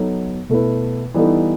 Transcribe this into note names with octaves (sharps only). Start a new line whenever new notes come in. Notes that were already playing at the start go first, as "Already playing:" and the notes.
Already playing: F#3 B3 D#4 A4
B2 A3 E4 B4
E3 G3 B3 D#4 A4